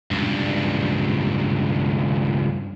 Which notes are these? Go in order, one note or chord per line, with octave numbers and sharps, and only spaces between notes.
C#2 G2